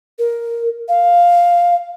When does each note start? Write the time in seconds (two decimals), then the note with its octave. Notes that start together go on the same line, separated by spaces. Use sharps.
0.19 A#4
0.88 F5